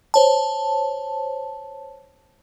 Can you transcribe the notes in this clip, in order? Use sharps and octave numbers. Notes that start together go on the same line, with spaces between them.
C5 C#5 A5